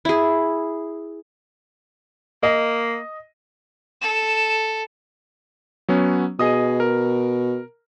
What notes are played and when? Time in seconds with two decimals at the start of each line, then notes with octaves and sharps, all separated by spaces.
0.05 E4 G#4
2.43 A#3 D#5
4.01 A4 E7
5.88 F#3 B3 C#4
6.39 B2 G#4 D#5 D#6
6.80 A#4